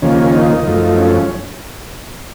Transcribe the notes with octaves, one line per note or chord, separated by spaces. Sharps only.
D#2 C#3 F3 A#3 C#4
D#4
F#2 F3 A3
C#4